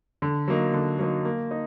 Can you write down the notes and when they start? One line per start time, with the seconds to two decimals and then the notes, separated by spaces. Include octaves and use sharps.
0.22 D3
0.48 F#3 A#3 D#4
0.74 D3
0.99 F#3 A#3 D#4
1.25 A#3
1.51 D#4